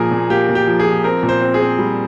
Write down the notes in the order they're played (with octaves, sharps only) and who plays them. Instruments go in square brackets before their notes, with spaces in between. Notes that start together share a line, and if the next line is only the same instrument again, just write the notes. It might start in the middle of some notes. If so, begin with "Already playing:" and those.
Already playing: [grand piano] A#2 F3 A#3 G#4 A#4
A#2
A#3 G4
A#2
G4
F3
G#4
F3
C4 A#4
A#2
C5
C4
G#4
C4
G3